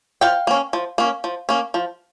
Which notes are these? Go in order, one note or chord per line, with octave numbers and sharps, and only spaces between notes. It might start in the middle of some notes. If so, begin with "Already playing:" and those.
F3 F5 G5
A#3 C#4
F3
A#3 C#4
F3
A#3 C#4
F3